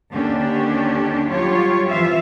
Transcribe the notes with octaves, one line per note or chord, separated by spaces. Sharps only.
D#2 D3 C#4 D4 G4
F#3 G3 F4 G4 C#5
F2 E3 F3 F4 E5 F5